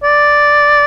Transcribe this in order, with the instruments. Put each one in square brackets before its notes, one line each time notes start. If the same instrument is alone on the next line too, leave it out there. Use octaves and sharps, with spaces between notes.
[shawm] D5